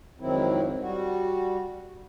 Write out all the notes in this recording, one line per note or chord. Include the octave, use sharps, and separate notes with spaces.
F2 G#2 D#3 F#3 C4 E4
G3 F#4